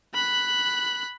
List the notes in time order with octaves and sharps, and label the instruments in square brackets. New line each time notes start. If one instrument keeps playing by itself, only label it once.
[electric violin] B5 F#6